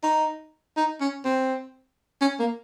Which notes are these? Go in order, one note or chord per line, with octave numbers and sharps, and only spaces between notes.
D#4
D#4
C#4
C4
C#4
A#3